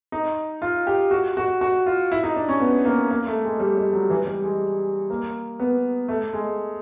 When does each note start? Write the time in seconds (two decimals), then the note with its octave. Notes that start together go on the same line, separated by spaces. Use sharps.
0.12 D#4
0.62 F4
0.87 G4
1.11 F#4
1.37 F#4
1.61 F#4
1.86 F4
2.12 E4
2.23 D#4
2.36 D4
2.49 C#4
2.60 B3
2.85 A#3
3.11 A#3
3.27 A3
3.44 G#3
3.60 G3
3.77 G3
3.93 F#3
4.10 E3
4.27 G3
4.44 G#3
5.10 A#3
5.60 B3
6.08 A3
6.33 G#3